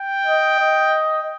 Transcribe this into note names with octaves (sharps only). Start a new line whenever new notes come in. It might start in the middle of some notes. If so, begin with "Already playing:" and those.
Already playing: G5
D#5
D#5